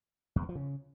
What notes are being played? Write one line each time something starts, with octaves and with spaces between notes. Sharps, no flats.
E2
G2
F3
C#3